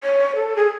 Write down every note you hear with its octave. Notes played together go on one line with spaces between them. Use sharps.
C#5
A4
G#4